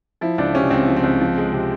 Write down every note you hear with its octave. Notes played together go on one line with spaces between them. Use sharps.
F3 E4
C#2 D4
C3 C#4
C#2 C4
F3
C4
C#2
F3
G#3
C3